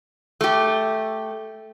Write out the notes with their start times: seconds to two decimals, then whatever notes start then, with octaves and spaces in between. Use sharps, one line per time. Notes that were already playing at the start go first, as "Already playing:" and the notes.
0.41 A3 G4